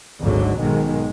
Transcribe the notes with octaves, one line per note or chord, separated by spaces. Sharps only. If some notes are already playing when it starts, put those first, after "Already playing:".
G#1 D2 G#2 D3 F#3
B1 G#2 B2 D#3 G#3